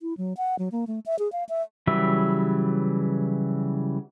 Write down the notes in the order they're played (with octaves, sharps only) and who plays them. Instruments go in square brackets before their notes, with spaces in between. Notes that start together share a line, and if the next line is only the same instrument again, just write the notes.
[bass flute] E4
F#3
F#5
F#3
A#3
A3
E5
G#4
F5
E5
[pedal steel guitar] C#3 E3 F#3 G3 E5